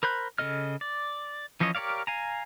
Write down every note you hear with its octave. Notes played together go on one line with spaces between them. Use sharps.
A#4 C5 B5 F#6
C#3 F4 A4 D#5 F6
D5
E3 F3 C#4 C#5 D#5
G4 A#4 C#5 D5 F5
F5 G#5 A#5